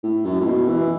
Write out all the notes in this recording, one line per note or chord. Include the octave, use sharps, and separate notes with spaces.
A2
F#2
A2
B2
E3